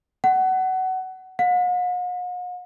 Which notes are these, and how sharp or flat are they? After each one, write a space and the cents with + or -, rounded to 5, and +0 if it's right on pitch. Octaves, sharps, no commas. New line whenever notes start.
F#5 +20
F#5 -45